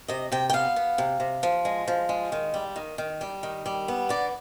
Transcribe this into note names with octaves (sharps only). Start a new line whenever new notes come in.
C3 D#5
C3 G5
G5
B3 F5
B3
C3
C3
F3
G#3
F3
G#3
D#3
G3
D#3
D#3
G3
D#3
G3
B3
D3 D5